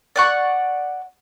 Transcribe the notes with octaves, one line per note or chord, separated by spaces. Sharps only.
D5 F#5 C#6